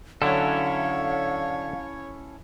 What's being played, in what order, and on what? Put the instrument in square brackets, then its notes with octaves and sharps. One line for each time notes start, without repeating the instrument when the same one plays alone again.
[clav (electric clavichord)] D3 F#3 [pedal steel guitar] C#4 E4 A4 [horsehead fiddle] C#5 [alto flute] F5